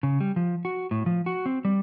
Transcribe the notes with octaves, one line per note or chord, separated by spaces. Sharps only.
C#3
G3
F3
F#4
A2
F3
F#4
C4
G3